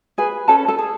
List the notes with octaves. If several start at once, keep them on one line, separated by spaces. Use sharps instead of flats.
G#4 B4 G#5
C#4 A4 A5
A4 A5
G#4